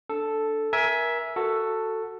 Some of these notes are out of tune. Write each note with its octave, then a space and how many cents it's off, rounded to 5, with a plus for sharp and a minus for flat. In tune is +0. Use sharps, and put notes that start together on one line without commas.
D4 +0 A4 +0
A#4 +25 E5 +0 G#5 +10
F#4 +0 A4 +10